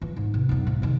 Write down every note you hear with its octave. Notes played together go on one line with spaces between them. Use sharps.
E3 F4
G#2
C3
B1 F2
G#2 G#3
C3 D#3